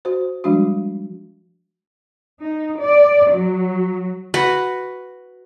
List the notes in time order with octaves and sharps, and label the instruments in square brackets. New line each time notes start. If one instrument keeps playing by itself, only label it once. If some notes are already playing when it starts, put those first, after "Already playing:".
[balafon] F#4 C5
F3 G3 G#3 D4 F#4
[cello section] D#4
D5
F#3
[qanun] F#4 B4